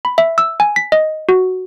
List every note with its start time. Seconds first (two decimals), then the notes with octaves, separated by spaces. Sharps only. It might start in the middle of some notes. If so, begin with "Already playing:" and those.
0.05 B5
0.18 E5
0.38 E6
0.60 G#5
0.76 B6
0.92 D#5
1.29 F#4